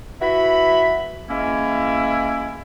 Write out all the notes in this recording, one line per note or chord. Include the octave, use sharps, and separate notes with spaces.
E4 F#4 B4 E5 B5
E3 G#3 A#3 C#4 E4